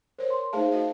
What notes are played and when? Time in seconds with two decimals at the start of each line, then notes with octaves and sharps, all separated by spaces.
0.19 A#4 C5 C#5
0.30 C6
0.53 A3 D#4 G#4 C5 F5 A5
0.72 F#4 D#5 F5